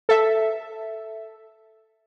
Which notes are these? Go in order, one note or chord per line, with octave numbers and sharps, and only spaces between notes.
A4 E5